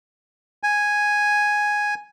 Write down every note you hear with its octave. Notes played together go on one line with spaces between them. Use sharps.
G#5